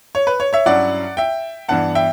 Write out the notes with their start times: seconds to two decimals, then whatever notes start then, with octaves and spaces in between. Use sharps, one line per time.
0.15 C#5
0.27 B4
0.40 C#5
0.53 C#5 E5
0.66 G2 F#3 C#4 E4 D5 F#5
1.17 E5 G5
1.68 G2 E3 B3 D4 F#5 A5
1.95 E5 G5